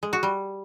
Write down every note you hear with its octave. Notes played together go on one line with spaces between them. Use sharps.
G#3
F#4
G3